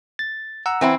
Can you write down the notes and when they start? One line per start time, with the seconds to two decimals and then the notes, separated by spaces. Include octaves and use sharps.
0.19 A6
0.66 F#5 A#5 E6
0.81 E3 C4 E4